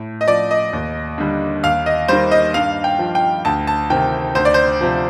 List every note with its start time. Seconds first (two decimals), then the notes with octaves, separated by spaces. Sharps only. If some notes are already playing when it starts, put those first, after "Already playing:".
Already playing: A2
0.21 D#5
0.27 F3 D5
0.51 D#5
0.73 D#2
1.18 D3 G3
1.63 D#2 F5
1.86 D#5
2.08 D#3 G3 C5
2.31 D#5
2.54 G2 F5
2.84 G5
2.99 F3
3.15 G5
3.45 D2 A5
3.67 A5
3.90 C3 D#3 G5
4.35 D2 C5
4.45 D5
4.54 C5
4.81 C3 F3